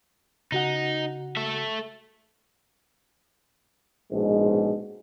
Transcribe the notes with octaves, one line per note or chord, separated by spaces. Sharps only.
C#3 D#4 F#4 F#5
A4 E5
A#1 G#2 B2 G#3